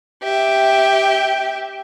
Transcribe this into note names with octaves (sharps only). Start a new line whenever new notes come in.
G4 E5